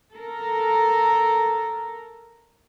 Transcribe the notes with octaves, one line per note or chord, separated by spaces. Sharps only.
A4 A#4